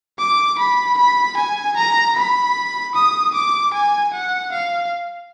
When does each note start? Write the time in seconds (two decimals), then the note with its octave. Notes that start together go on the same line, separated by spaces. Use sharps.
0.18 D6
0.58 B5
0.97 B5
1.36 G#5
1.76 A#5
2.16 B5
2.94 D#6
3.34 D6
3.73 G#5
4.13 F#5
4.52 F5